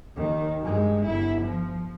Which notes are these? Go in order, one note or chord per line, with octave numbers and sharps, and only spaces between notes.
D#2 D#3
G2 G#3
G1 E4
F3